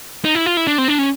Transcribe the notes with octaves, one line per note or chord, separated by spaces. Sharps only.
D#4
E4
F4
E4
D4
C4
D4
C#4